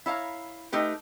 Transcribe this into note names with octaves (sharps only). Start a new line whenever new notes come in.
E4 C#5 F5 A#5
A3 D#4 G4 B4